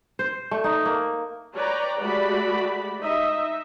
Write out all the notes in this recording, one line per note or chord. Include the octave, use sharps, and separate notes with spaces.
C5
A3
D#4
A#3
B4 C#5 D5 G5 A#5
G#3 A3 F#4 G4 D5 B5
D#4 D#5 E5